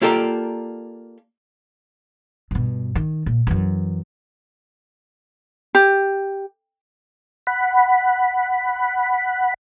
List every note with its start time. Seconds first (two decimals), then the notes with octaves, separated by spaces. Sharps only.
0.02 A#3 F4 G4 A4 A#4 D5
2.51 G2 B2
2.95 D#3
3.26 A#2
3.47 F#2 E3
5.75 G4
7.47 F#5 B5